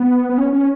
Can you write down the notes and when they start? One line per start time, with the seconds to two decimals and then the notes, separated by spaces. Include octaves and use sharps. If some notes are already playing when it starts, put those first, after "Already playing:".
Already playing: B3
0.29 B3
0.38 C#4
0.53 C#4